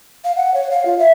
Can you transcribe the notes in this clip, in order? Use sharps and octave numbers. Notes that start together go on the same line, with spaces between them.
F5
F#5
C#5
F5
F4
E5